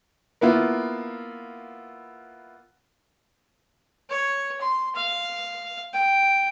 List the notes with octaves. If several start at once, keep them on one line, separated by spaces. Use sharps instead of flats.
A#3 B3 E4 F4
C#5
C6
F5
G5